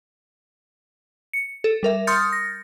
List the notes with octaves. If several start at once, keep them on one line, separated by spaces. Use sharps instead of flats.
C#7
A4
G3 A#4 E5
C6 D#6 F6 G6 A6 C#7
A#6